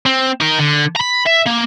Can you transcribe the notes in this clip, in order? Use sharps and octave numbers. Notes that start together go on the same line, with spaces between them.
C4
D#4 A#4
D3
A#5 B5
E5
A#3